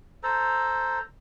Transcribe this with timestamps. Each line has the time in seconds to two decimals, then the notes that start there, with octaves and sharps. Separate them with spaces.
0.23 A4 C5 A#5